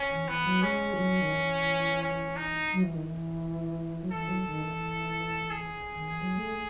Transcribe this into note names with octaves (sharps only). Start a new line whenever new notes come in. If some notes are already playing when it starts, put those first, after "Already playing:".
Already playing: C#4
E3
E3 B3
F#3
G#3 C#4
E3
F#3
D#3
E3
C#4
D#4
F#3
E3
D#3
E3
F#3
E3 A4
F#3
D#3
E3
G#4
D#3
E3
F#3
A3